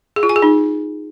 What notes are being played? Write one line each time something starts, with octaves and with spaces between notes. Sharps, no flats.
G#4
F4
G#5
G#4
D#4